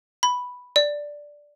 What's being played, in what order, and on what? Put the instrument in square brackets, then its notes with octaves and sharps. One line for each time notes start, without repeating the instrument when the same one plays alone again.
[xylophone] B5
D5